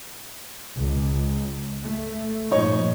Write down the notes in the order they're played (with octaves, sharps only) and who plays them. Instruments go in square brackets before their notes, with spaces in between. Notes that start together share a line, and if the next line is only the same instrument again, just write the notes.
[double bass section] C#2
A3
[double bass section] G2 A#2 F3 [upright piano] D#4 C#5